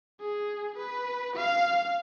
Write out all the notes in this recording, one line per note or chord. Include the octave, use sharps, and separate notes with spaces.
G#4
B4
F5